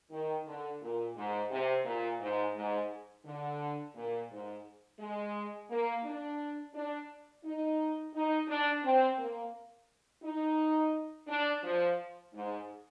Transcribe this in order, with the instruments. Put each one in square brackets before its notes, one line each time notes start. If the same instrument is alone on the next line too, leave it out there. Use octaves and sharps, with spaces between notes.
[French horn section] D#3
D3
A#2
G#2
C3
A#2
G#2
G#2
D3
A#2
G#2
G#3
A#3
D4
D4
D#4
D#4
D4
C4
A#3
D#4
D4
F3
G#2